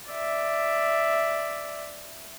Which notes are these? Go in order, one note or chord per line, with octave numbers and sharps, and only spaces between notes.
D5 E5